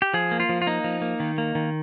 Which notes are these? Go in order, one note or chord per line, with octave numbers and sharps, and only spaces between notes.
G4
F3 G#4
A#3
F4
F3
F4
A#3 D#4
F3
A#3
D#3
A#3
D#3